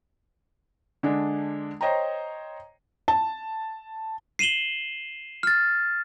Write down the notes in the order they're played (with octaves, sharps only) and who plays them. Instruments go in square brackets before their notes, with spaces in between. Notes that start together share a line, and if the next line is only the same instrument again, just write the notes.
[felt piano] D3 G#3 D4
C5 C#5 D#5 G5 A#5
A5
[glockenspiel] C7 D#7 E7 F#7 G7
F6 A6